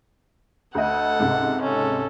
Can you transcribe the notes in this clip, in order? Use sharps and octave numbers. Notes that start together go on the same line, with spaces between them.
D2 A4 D#5 F#5
C#2 G#2 C3
C#4 A4